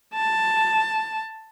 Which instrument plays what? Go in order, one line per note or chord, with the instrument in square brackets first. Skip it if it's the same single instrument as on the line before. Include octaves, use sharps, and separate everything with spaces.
[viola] A5